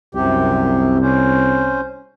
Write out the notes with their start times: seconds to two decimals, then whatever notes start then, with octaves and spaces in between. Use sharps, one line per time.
0.15 C2 F#2 C3 G4
1.01 C#4 C5